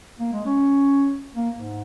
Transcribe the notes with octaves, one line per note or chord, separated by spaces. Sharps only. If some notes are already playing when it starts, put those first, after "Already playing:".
A#3
G#3
C#4
A#3
G#2